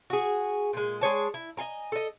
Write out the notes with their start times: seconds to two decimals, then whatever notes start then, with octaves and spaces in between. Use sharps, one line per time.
0.10 F#4 G#4
0.73 A#2 G#3
1.01 G#3 G#4 C#5 A5
1.34 E4
1.57 D#5 F5 G#5 A#5
1.92 A4 D#5